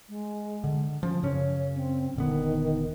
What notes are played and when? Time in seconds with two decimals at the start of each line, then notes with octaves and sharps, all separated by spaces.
0.09 G#3
0.64 D3
1.03 F3 C#4
1.23 F#2 C#3 C#4 C#5
1.75 C4
2.16 D#1 D3 D#3 B3